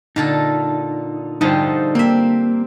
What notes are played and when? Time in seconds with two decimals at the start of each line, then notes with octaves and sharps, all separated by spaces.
0.16 A#2 D3 D#4 A4
1.41 D3 F3 G3 D#4 C5
1.95 A#3 C4 E5